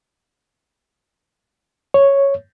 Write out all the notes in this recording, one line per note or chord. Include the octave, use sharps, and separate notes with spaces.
C#5